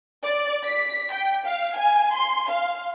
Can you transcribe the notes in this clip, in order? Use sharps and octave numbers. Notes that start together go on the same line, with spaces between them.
D5
B6
G5
F5
G#5
C6
F5